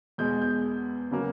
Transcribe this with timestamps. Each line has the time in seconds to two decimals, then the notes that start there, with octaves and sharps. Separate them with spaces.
0.18 E2 B2 G#3 G6
0.42 G6
1.11 C#3 F#3 A#3